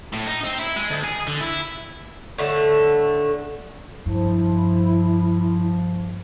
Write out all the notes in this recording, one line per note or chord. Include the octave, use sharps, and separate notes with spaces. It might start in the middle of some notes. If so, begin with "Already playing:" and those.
A2
D#4
C4
E4
G#3
D2
G#4
D3
E4
A2 D3 A3
G2 F3 E4